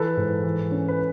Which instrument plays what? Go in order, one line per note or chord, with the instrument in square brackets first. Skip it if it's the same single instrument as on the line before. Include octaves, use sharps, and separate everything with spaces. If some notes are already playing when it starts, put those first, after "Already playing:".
Already playing: [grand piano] E3 A4 B4
G#2
E3
C#4
B4